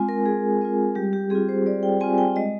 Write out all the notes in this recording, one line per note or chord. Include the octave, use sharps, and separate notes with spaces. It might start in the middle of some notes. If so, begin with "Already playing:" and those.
Already playing: G#3 C4 F4 G#5
A#4
G#3 G#4
C4 F4
G3 G4
G4
C4 F4 G#4
C5
G3 D5
G5
C4 F4 G#5
G5
G#3 D#5